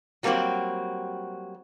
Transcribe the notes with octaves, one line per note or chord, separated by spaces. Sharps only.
F#3 G3 A3 A#3 C4 F#4